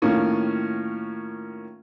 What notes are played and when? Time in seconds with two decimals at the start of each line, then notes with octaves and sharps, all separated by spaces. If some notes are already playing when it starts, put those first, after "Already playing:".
0.02 A2 D#3 A#3 C#4 F4